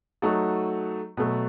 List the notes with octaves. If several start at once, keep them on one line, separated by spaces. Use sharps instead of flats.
F#3 A3 D#4 F#4 A4
B2 F#3 A3